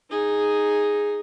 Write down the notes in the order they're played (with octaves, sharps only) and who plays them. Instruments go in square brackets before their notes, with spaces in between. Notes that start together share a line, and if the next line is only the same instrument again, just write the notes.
[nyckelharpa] D#4 G#4